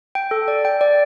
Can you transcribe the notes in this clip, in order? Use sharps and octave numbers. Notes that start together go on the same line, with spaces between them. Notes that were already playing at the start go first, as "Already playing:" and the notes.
G5
A4
D5
G5
D5